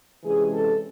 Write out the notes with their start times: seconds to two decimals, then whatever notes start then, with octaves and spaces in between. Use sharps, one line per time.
0.24 C3 E3 G#3 C#4 G#4
0.52 A4